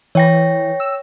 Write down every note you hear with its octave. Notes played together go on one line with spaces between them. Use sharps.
E3 C#5 G5 A#6
E6